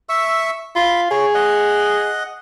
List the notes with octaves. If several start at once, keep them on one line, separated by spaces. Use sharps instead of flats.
E5 C#6 E6
F4 B5
G#4 C#5
D#5 F#5